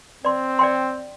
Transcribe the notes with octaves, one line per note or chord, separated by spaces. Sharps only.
C4 D5 C6
D5 G5 C6